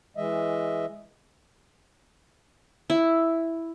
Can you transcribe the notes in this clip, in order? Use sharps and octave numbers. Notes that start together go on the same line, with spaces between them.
E3 G#3 D#5 E5
E4